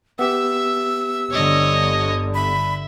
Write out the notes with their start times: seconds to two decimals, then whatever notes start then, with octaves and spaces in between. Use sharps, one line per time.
0.19 B3 G4 E5 E6
1.31 G1 D3 C#5 D#5
2.34 E5 B5